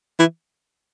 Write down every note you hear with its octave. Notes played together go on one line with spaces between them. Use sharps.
E3